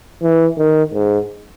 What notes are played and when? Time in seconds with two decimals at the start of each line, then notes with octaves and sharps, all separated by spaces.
0.23 E3
0.58 D#3
0.94 G#2